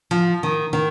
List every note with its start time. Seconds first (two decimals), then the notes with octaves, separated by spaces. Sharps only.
0.11 F3
0.43 D#3
0.73 D#3